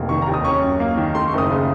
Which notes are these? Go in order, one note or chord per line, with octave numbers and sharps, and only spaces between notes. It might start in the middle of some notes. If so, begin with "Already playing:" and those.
Already playing: F1 F2 A#3
D#3 C#6
A#5
D#2
D#6
C#4 C#6
F#2
A#3
D#3
A3 C6
C#6
F#1 D#6
C#3